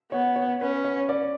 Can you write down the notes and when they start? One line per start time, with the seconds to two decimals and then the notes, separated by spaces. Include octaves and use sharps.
0.12 B3 C#5
0.36 C#5
0.61 C#4 B4
0.85 C#5
1.09 D5